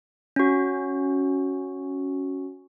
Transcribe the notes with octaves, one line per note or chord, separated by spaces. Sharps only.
C#4 F#4